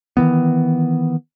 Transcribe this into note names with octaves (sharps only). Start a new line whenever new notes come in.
D#3 E3 B3